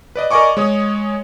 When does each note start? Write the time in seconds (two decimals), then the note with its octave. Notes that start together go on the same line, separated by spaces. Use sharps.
0.16 B4 D5 D#5
0.31 A#4 D5 D#5 G#5 C#6 D6
0.57 G#3 C#5 D#6